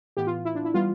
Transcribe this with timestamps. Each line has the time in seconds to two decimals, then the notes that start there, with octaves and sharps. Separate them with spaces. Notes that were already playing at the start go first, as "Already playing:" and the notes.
0.17 A2 E3 B3 G4
0.27 F4
0.45 E4
0.55 D4
0.65 E4
0.74 E3 G3 B3 F4